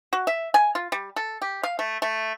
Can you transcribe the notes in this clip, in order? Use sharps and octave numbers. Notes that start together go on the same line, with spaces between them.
F#4
E5
G#5
F4
G3
A4
G4
F5
A3
A3